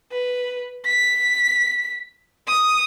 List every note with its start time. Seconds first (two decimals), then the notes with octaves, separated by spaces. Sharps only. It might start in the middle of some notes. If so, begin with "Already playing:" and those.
0.12 B4
0.85 B6
2.47 D#6